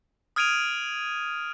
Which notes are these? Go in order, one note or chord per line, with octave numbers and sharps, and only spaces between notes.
D#6 F6 G#6 D7 D#7 F7